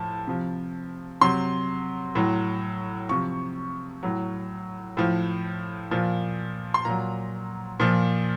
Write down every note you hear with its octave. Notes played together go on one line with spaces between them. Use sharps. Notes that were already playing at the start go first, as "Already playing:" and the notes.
Already playing: A2 F3 A5
C3 F3
C3 F#3 C6
A2 F#3
C3 F3 C#6
A2 F#3
A2 F3
A#2 F3
C6
A#2 F#3 A#5
A#2 F3